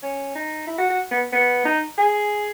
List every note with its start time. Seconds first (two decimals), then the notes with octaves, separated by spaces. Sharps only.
0.03 C#4
0.35 D#4
0.67 E4
0.78 F#4
0.90 F#4
1.11 B3
1.32 B3
1.65 D#4
1.98 G#4